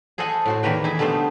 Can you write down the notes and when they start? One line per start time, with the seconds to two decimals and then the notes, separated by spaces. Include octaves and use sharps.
0.18 G#4 A4 C5 D#5 F#5 G#5
0.45 A2 F#4 C5
0.63 E2 D#3 A#3 B4 G5
0.84 D#4 G#4 E5
0.99 D3 G3 A3 B3 C5